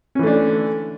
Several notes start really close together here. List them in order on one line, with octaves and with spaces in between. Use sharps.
C#4 E3 A3 D4 D3